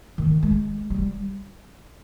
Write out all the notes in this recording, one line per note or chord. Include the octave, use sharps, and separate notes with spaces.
D#3
G#3
G3